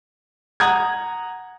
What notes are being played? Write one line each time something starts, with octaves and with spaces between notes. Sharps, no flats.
F#5 A#5 D#6 G#6